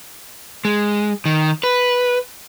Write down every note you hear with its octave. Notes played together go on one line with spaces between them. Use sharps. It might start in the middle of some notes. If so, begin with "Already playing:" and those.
G#3
D#3
B4